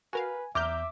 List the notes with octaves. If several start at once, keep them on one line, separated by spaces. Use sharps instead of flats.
F#4 A#4 B4 F5 G#5
E2 E5 A#5 D6 F6 G6